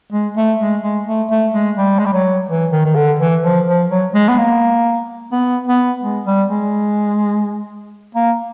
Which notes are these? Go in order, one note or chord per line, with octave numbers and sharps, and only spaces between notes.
G#3
A3
G#3
G#3
A3
A3
G#3
G3
G#3
G3
F#3
E3
D#3
D#3
D3
E3
F3
F3
F#3
G#3
B3
A#3
B3
B3
G#3
G3
G#3
A#3